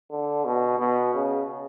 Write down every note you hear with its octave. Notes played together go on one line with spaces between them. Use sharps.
D3
B2
B2
C#3